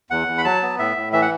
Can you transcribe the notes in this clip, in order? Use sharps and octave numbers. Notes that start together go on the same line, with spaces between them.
E2 F#5
E2
B5
F#3 A5
B3
A2 E5
A2
E3 E5
F#5